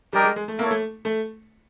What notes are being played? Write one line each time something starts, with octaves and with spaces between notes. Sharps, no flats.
G3 D4 G4 A#4 D#5 G5
G#3
G#3
A3
A#3 E4 A4 C#5
A3
A3